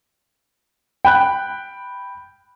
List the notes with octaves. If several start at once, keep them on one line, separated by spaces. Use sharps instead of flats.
G5 B5 F#6